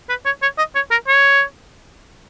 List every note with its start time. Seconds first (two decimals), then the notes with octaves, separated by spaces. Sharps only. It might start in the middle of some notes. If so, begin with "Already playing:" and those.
0.09 B4
0.25 C#5
0.42 C#5
0.58 D#5
0.75 C#5
0.91 A#4
1.07 C#5